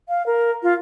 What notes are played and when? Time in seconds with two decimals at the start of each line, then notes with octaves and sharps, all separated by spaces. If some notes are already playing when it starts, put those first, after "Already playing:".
0.09 F5
0.26 A#4
0.63 F4